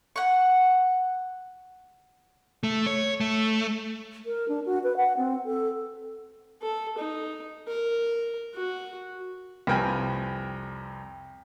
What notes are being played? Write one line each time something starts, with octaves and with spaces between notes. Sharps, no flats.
F#5 C#6
A3
C#5
A3
A#4
D4
F#4
B4
F#5
C4
A4
A4
D#4
A#4
F#4
C2 F2 B4 G5 G#5 F6